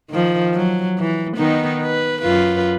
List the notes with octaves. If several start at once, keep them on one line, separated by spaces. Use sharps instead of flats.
D#3 F3
F#3
E3
D#3 B3 D#4
B4
F#2 F4 B4